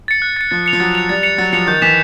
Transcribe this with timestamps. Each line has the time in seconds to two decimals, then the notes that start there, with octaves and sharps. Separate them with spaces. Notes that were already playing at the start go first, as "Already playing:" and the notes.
0.08 A6 C#7
0.22 F#6
0.37 A6 C#7
0.51 F3 A6
0.66 C#7 F7
0.73 F3
0.80 F#3 A6
0.95 C#7 F7
1.09 G3 A6
1.23 C#7 F7
1.38 F#3 A6
1.52 F3 C#7 F7
1.67 D#3 G6
1.82 E3 B6 E7